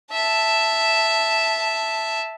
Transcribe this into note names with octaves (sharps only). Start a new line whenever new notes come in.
E5 A5